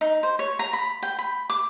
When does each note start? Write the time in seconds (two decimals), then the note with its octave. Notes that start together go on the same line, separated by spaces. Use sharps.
0.01 D#4
0.23 C5
0.39 C#5
0.59 A#5
0.73 B5
1.03 G5
1.19 B5
1.50 D6